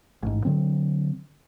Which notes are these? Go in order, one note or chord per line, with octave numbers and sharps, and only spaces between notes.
A1 G#2
D3 F#3 C4